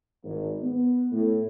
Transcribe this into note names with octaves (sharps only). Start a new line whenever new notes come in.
G#1
B3
A2